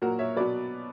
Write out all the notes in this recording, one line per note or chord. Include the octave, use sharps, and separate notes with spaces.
A#2 F#3 F#4 A#4
C#5 E5
B2 F#3 B4 D5